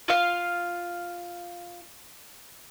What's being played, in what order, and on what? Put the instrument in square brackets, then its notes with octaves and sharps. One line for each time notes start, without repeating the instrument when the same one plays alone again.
[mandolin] F4 F5